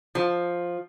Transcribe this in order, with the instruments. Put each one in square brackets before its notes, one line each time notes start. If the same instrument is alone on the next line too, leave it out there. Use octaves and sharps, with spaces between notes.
[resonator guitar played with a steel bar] F3